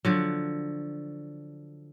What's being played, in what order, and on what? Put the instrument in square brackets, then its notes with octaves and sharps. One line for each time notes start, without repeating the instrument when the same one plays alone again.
[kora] D3 F3 F#3